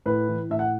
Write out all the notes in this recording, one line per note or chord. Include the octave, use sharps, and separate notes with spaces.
A2 B4
E3
A2 E5
F#5